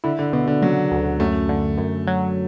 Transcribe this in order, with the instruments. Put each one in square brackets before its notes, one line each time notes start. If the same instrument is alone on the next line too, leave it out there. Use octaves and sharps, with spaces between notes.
[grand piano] D3 [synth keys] E4
[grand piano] D3
[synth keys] B2 [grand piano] D3
[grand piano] D3
[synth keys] C#3 [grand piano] F#3
[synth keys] D2
[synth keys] F#2 [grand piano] A3
[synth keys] D3
F#2
F#3